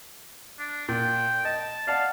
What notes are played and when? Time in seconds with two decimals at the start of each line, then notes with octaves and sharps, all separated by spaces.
0.59 D4
0.88 A#2 G5
1.45 D#5 A5
1.87 D5 F5 F#5 A5